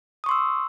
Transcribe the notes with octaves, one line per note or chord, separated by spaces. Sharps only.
C6 C#6 D#6 E6